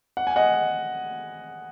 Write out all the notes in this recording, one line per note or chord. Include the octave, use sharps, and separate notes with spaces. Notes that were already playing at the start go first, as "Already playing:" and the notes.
F#5
G#5
D#5 F#5